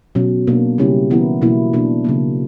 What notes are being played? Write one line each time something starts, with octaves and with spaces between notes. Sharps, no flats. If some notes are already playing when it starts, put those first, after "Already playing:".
B2 F#3 C#4
B2 A#3 D4
C#3 G3 C#4 E4 G4
E3 B3 E4 A#4
B2 F#3 A#3 E4
B2 A#3 D4
C#3 F#3 A#3